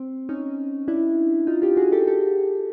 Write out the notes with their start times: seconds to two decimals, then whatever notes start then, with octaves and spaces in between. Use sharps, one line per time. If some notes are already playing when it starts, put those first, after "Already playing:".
Already playing: C4
0.29 C#4 D#4
0.88 D4 E4
1.47 D#4 F4
1.62 F4 G4
1.77 F#4 G#4
1.92 G4 A4
2.07 G4 A4